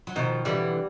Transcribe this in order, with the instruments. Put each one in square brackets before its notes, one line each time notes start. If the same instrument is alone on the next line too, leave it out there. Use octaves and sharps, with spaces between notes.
[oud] F#3
[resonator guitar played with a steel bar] B2 [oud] D#3 F3
[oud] D3 E3 [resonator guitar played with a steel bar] G3